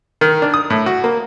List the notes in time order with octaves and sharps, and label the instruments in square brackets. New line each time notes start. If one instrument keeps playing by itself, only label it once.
[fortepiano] D#3
D4
D#6
A2
F#4
A#3